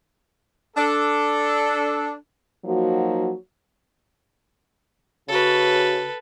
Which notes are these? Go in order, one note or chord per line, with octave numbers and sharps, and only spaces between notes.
D4 A4
F3 F#3 A#3 D#4 F#4
C#3 F#4 A4 B4